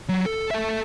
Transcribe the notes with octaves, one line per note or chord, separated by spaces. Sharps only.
F#3
A4
A4 E5